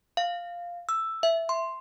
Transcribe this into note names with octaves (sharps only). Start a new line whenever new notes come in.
F5
E6
E5
C6